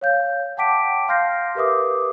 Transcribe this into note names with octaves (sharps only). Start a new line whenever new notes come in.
C#5 F5 G6
F#5 G5 A5 D6 B6 D7
F5 C6 F6 G6 A#6 C7
G4 A#4 B4 E5 D6 D#6